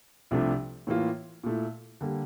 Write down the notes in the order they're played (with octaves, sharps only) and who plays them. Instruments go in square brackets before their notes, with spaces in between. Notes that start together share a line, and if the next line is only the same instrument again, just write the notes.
[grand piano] C2 C3 F3 A3 D4
A2 E3 A#3 F4
A#2 A3 E4
D3 G3 A#3